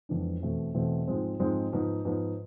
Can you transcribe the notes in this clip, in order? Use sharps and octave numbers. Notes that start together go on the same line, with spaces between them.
F2 E3 G#3 B3 D4
E2 B2 A3 C4
E2 B2 A3 C4
G#2 F3 G#3 C4
G#2 F3 G#3 C4
G#2 F3 B3
G#2 F3 B3